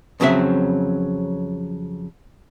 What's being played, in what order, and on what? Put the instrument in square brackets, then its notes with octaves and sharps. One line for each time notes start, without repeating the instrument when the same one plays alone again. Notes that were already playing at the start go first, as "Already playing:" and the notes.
[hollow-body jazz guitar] F2 C#3 F#3 C4 E5